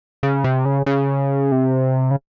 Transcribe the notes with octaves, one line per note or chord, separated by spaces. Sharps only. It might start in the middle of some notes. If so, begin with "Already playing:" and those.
C#3
C3
C#3
C#3
C3
C#3